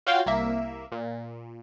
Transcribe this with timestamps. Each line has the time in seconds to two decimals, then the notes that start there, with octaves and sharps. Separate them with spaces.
0.07 F4 F#4 C#5 F5 G5 C6
0.26 C2 A#3 E5
0.92 A#2